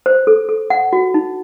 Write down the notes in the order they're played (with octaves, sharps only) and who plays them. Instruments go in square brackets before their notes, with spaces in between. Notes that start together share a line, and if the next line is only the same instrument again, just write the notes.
[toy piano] C5
A4
A4
F#5
F#4
D#4